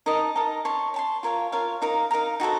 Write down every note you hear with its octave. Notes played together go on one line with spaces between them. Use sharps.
D#4 A#4 D#5 A5
D#4 A#4 D#5 A5
C#5 A5 C6
C#5 A5 C6
F4 A#4 C#5 F5
F4 A#4 C#5 F5
D#4 A#4 F5 A#5
D#4 A#4 F5 A#5
D#4 F#4 A4 C5